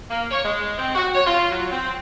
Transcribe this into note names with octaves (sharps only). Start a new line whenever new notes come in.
A#3
C#5
G#3
C4
F#4
C#5
F4
F#3
C4